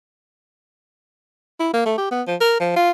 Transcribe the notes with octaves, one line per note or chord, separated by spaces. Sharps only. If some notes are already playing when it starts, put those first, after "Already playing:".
E4
A#3
A3
G4
B3
F3
A#4
F3
F4